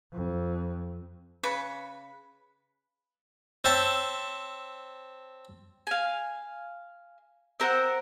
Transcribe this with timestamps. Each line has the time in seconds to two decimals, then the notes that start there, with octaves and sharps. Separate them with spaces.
0.13 F2
1.43 C#3 B4 C#6
3.64 C4 C5 C#5 E5 A5
5.87 F5 G#5
7.60 C4 A#4 C5 F#5